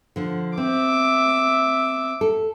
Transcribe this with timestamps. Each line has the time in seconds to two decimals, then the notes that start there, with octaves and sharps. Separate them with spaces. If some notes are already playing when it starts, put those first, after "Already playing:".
0.16 D3 F3
0.58 C4 E5 D6
2.21 A4